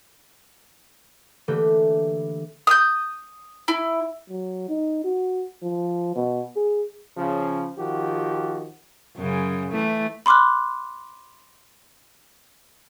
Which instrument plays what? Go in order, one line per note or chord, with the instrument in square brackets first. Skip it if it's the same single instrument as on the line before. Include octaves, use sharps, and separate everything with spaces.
[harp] D3 E3 A3 A#3 E4 G4
[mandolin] D#6 G6
E4
[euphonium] F#3
D#4
F#4
F3
B2
G#4
[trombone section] C#3 F3
D#3 F3 F#4 G4
[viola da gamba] F#2 C#3
E3 A3
[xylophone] B5 C6 D6 F6 F#6